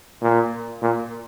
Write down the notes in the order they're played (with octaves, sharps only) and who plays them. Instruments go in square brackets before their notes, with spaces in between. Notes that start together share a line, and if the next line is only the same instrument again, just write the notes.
[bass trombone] A#2
A#2